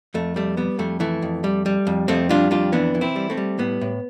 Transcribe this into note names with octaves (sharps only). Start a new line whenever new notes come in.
F2 A3
G3 A3
G3 B3
F2 A3
E3 A3
F2
G3
G3
F2
F2 A3 C4
G3 D4 F4
F2 D4 F4
E3 B3 D4
E3
C4 E4
G3
A3 C4
G3
A2 B3
A2